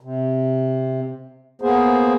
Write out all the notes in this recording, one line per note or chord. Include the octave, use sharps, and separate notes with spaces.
C3
A#3 B3 G#4 C5